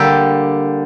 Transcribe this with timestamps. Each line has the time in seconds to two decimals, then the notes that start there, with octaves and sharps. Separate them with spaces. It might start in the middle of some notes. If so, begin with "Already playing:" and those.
Already playing: D3 G3 A#3 G4 A4